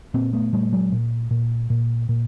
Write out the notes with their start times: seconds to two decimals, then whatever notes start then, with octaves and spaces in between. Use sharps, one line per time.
0.14 A#2 A#3 C4
0.33 A3 B3
0.53 A#2 G3 A3
0.73 F#3 G#3
0.92 A#2
1.31 A#2
1.70 A#2
2.09 A#2